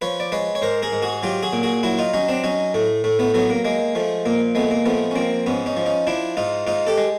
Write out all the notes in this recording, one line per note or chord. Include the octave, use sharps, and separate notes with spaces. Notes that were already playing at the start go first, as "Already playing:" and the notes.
F3 B4 C#5
D5
G#3 B4 C#5
C#5
G#2 A#4 C5
G#4 A#4
G#2
F#4 G#4
F#3 F4 G4
F#4 G#4
A#2
F#4 G#4
F#3 E4 F#4
D#4 F4
F#3 C#4 D#4
C4 D4
F#3 C#4 D#4
A2 A3
A2 A3
A3 B3
F#3 A3 B3
A#3
G#3 A#3
F3 A3
A#2 A#3
G#3 A3 B3
A#3
F3 A3 B3
C#4
F3 A#3 C4
G#2 B3 C#4
C#4 D#4
F3
C#4 D#4
F3 D4 E4
G#2 D#4 F4
G#2 D#4 F4
G4 A4
G#3